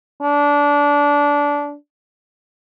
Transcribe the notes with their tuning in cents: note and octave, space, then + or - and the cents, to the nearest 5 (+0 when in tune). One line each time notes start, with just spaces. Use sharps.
D4 -20